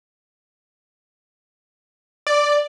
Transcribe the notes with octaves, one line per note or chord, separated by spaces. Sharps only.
D5